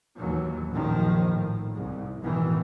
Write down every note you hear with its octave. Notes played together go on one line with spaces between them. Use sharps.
D#2 E3 F#3
A#1 F#2 D#3 F3
A2
C2 G#2
A1 F2 B2 D#3 E3